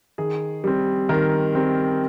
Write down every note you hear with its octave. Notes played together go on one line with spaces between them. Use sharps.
D#3 G#4
G3 C4
D#3 A#4
G3 C4